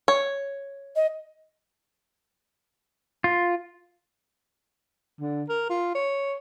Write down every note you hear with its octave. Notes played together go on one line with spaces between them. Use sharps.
C#5
D#5
F4
D3
A#4
F4
C#5